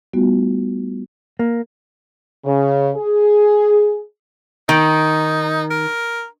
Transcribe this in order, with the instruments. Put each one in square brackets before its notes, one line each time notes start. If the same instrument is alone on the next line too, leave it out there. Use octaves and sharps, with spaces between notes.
[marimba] G3 A3 B3 D#4 F4 F#4
[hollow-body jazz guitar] A#3
[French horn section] C#3
G#4
[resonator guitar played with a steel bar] D#3 [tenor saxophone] D#4
[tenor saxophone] A#4